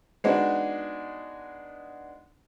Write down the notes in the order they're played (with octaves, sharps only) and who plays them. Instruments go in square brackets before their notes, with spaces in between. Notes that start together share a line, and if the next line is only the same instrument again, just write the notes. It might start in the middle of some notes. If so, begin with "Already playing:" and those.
[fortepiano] G#3 B3 D4 D#4 F#4